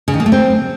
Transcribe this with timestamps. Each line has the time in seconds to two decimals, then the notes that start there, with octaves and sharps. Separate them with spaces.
0.08 C#3
0.14 D#3
0.20 A#3
0.26 A3
0.32 C4